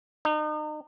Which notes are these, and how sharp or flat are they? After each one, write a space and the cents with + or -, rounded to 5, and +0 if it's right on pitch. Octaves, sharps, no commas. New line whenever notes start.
D#4 -35